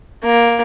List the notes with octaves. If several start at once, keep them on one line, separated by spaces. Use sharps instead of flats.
A#3